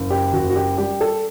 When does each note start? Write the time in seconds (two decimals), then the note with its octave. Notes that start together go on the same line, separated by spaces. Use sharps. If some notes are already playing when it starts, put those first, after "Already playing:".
Already playing: F#1
0.10 G4
0.33 F#1 F#4
0.49 F#4
0.56 G4
0.78 G3 G4
1.01 A4